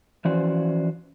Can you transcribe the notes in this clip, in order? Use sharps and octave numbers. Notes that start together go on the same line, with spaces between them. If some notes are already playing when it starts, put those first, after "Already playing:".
E3 F3 C#4 F#4 C5 D5